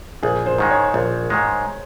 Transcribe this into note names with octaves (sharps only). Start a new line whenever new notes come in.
A#1 G#4
C5
G#2 D#3 G#3
C#5
A#1
G#2 D#3 G#3